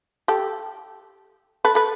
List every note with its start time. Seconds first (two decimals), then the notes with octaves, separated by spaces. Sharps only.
0.28 G4 A4
1.65 A4 B4
1.75 A4 B4